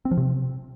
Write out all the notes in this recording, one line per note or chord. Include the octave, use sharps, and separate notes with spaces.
C4
F3
C3